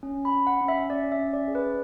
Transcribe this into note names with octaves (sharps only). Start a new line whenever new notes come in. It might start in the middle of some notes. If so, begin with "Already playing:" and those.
C#4
B5
C#4
F#5
C#4
E5
C#4 D5
E5
C#4
D5
G#4
B4